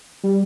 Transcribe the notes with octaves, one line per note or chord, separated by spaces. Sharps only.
G3